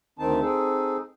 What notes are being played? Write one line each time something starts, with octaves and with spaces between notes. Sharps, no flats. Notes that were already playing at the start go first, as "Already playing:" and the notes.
D2 D#3 C4 D#4 A5
C4 D#4 G#4 A4